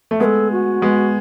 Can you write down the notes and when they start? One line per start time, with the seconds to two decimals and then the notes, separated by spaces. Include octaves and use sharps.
0.11 A3
0.20 G#3 B3 A4 B4
0.52 F#4
0.82 G#3 B3